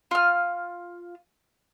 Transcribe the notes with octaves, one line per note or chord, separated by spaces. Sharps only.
F4 F6